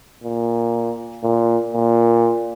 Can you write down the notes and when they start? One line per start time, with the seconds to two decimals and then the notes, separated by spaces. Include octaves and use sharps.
0.23 A#2
1.23 A#2
1.74 A#2